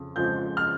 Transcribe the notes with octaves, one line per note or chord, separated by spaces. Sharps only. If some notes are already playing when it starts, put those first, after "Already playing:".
Already playing: F2 C#3
F2 C#3 F3 G#3 G6
F6